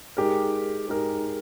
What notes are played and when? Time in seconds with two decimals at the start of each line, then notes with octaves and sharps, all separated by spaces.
0.17 G#3 D#4 G4 A#4
0.88 G#3 D#4 G4 A#4